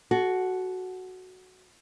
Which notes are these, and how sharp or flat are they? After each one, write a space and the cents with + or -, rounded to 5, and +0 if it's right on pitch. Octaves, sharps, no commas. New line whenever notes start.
F#4 +0 A4 -30